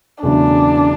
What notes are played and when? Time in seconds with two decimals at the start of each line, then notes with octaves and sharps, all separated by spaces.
0.22 E1 E2 C#3 F#3 A3 D4